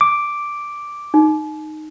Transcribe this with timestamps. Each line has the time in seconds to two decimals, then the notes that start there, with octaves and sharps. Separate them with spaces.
0.01 D6
1.14 D#4